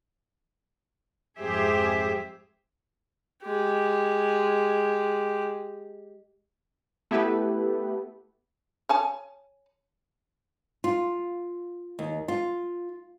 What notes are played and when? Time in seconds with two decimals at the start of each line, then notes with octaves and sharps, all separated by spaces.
1.38 F2 G#2 G4 G#4 C5 E5
3.44 G#3 G4
7.11 A3 B3 E4 G4 A4 B4
8.89 C#5 G#5 A5
10.84 F4
11.99 D#2
12.28 F4